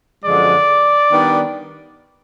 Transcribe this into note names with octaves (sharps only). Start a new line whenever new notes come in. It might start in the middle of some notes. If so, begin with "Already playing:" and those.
F#2 D3 F3 G#3 D5
D#3 G3 B3 D4